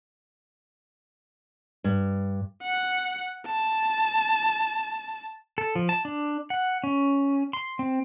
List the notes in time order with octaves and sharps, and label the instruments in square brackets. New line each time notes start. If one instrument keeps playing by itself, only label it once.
[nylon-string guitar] G2
[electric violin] F#5
A5
[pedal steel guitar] A4
F3
A5
D4
F#5
C#4
C6
C4